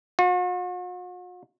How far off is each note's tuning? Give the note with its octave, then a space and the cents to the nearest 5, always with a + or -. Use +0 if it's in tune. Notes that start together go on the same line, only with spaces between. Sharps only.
F#4 -45